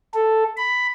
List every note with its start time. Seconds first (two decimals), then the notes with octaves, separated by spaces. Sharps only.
0.14 A4
0.57 B5